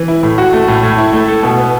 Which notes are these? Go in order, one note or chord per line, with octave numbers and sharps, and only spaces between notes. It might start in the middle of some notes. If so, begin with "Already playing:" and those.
Already playing: E3
E4
A2
F#4
A3
A2
A2
E4
A3
A4
B2
B3